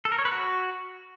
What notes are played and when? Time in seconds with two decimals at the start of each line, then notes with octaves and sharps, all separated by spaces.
0.05 A4
0.12 A#4
0.18 C#5
0.25 B4
0.32 F#4